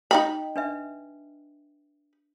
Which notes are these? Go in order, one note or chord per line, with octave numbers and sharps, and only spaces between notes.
D#4 D#5 G5 B5
D4 B4 E5